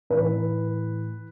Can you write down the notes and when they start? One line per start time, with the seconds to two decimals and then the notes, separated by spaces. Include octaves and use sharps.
0.10 A2 E3 B4